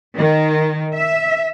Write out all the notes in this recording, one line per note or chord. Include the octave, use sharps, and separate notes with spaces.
D#3
E5